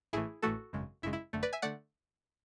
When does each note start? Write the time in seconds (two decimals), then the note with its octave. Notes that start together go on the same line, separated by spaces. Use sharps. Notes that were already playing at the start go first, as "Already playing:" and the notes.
0.13 A1 A2 E3 A3 E4 G#4
0.42 A1 A2 E3 A3 F#4 A4
0.73 G#1 F#2 C#3 G#3
1.02 G#1 F#2 C#3 G#3 E4
1.13 E4
1.33 G#1 F#2 D3 A3
1.43 B4 D5
1.53 E5 G#5
1.62 D3 A3 D5 F#5